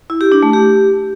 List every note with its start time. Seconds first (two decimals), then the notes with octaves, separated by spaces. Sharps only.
0.10 E4
0.21 G4
0.32 D4
0.43 A3
0.53 G4